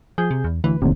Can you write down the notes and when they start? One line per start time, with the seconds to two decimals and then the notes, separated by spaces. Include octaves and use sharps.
0.18 F3 G#4 G6
0.31 C3
0.44 E2
0.64 D2 E3 B4
0.82 F1 D#2 A2 C3